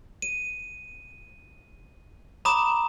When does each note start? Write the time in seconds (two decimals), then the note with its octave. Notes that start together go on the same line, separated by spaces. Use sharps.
0.22 D#7
2.45 A#5 B5 D6 D#6 E7